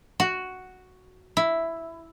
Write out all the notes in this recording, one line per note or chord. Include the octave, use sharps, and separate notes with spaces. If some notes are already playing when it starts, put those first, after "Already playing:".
F#4
E4